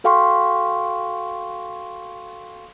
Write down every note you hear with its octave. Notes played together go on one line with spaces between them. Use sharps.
F#4 A4 F5 G5 C6 C#6